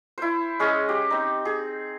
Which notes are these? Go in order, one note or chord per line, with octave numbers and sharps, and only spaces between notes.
E4 C5
G#3 C#4 G#4 D#5
G4
C4 D#4
G#4